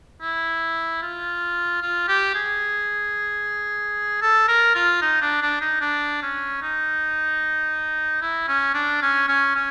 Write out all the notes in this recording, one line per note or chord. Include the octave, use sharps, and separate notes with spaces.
E4
F4
F4
G4
G#4
A4
A#4
F4
D#4
D4
D4
D#4
D4
C#4
D#4
E4
C#4
D4
C#4
C#4
C#4